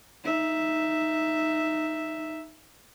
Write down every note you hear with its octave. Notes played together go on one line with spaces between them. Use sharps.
D#4 E5